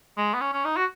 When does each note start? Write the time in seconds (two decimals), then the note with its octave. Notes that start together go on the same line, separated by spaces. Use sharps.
0.17 G#3
0.34 B3
0.41 C#4
0.53 C#4
0.65 D#4
0.77 F#4